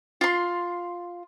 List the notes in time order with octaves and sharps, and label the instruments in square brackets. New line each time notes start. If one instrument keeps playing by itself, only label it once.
[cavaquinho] F4 C6